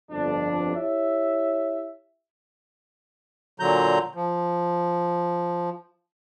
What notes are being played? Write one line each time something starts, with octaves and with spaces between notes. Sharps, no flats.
G1 F2 D4
E4 G4 C#5 E5
A#2 D3 F#3 A#5 G6
F3